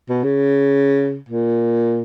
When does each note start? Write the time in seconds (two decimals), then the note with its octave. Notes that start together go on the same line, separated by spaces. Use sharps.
0.09 B2
0.24 C#3
1.29 A#2